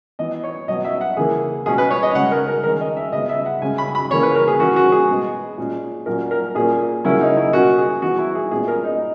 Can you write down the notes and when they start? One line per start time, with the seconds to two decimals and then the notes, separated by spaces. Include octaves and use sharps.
0.19 E3 B3 D#5
0.44 C#5
0.68 B2 F#3 B3 D#5
0.85 E5
1.01 F#5
1.17 C#3 E3 A#3 G#4
1.66 B2 G#3 C#4 G#4
1.78 B4
1.90 C#5
2.03 D#5
2.15 C#3 G#3 C#4 F#5
2.31 A#4
2.48 A#4
2.64 D#3 G#3 C#4 A#4
2.80 D#5
2.97 E5
3.12 C#3 G#3 B3 D#5
3.29 E5
3.46 F#5
3.62 C#3 G#3 C#4 G#5
3.78 B5
3.95 B5
4.11 C#3 E3 A#3 C#4 C#5
4.23 B4
4.35 A#4
4.48 G#4
4.60 E3 A#3 C#4 F#4
4.76 F#4
4.92 G#4
5.09 B2 G#3 B3
5.58 A#2 G#3 C#4
6.06 A#2 F#3 C#4 A#4
6.31 A#4
6.55 A#2 A#3 C#4 G#4
7.05 C#3 F#3 A#3 C#4 E4
7.21 D#4
7.37 E4
7.53 B2 A#3 C#4 F#4
7.78 G#4
8.02 E3 B3 F#4
8.19 E4
8.35 G#4
8.51 A#2 G#3 B3 G#4
8.68 A#4
8.84 D#4